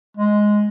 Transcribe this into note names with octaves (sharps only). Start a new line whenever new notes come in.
G#3